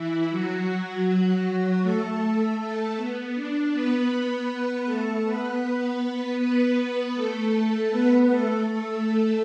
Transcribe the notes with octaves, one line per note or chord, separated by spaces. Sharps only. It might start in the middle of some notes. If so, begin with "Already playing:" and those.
Already playing: E3 E4
F#3 F#4
A3 A4
A3 A4
B3
D4
B3 B4
A3 A4
B3 B4
B3 B4
A3 A4
B3 B4
A3 A4
A3 A4